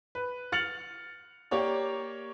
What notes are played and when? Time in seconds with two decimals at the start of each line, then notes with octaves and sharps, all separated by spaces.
0.15 B4
0.52 F6 A6 C#7 F7 F#7
1.51 A#3 G4 C#5 D5